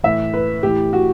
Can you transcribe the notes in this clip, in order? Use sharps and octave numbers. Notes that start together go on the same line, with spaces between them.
A2 E3 E5
B4
A2 E3 G4
F#4